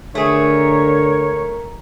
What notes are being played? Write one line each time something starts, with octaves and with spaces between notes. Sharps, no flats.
D3 A3 G#4 A#4 C#5